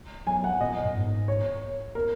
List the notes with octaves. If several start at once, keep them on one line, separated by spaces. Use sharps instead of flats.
F#3 G#5
F#5
A#2 D#5
F#2
G#2
C#5
A#4